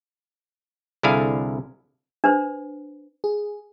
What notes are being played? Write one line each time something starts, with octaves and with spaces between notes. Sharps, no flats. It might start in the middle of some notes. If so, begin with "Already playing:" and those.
C2 D3 E4 G#4 A4 F5
D4 B4 C5
G#4